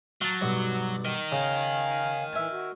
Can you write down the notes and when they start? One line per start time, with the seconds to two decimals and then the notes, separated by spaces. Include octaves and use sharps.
0.21 F#3 F5 A5
0.41 B1 G2 F#5
1.05 A#4 D#5
1.32 C#3 F5 G#5
2.33 E3 E5 G#5
2.51 F#4